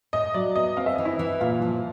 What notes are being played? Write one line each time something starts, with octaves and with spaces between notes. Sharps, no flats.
A2 D#5
F#3 D5
B3 D#5
C4 F5
E5
E3 D#5
E4 E5
E3
A#2 F4 F5
F3